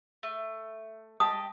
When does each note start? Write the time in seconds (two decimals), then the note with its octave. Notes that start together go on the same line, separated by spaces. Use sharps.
0.23 A3
1.20 G4 D#5 A5 D#6